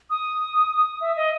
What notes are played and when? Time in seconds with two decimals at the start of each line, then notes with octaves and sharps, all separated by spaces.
0.10 D#6
1.01 E5
1.16 D#5